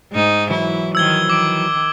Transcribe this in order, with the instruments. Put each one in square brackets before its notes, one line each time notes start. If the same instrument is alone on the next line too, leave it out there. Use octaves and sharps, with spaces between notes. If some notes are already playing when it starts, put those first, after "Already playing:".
[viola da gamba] G#2 D#4
[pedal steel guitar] E3 F#3 [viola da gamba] E4
[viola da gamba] D#3 F3 [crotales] E6 G#6 G7
[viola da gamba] D#3 [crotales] D6 D7